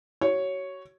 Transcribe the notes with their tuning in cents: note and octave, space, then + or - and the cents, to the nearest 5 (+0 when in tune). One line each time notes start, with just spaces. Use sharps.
F#4 +35 C#5 +0